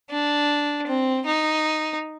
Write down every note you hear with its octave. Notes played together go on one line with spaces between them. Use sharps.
D4
C4
D#4